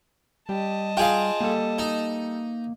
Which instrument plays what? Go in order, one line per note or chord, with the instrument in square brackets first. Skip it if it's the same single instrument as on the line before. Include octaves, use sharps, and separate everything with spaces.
[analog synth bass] G3 [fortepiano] G4 [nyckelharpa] D#5 A5
[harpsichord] F4 G#4 F5 [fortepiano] G5 G#5
[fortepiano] G3 A4 [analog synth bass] A#3
[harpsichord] D#4